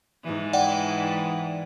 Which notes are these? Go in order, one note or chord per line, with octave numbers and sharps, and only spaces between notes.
G#2 E3
D5 F#5 G5